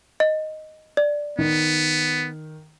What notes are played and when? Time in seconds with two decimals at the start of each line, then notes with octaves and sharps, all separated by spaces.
0.20 D#5
0.97 D5
1.39 D#3 B3